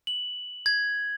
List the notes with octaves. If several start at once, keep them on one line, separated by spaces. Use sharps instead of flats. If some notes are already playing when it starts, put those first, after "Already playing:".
F#7
G#6